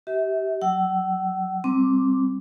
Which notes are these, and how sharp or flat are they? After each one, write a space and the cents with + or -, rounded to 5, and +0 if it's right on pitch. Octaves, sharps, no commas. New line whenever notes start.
G4 -25 E5 -30
F#3 +0 F#5 +40 E6 +0
G3 +0 C4 +10 D6 +0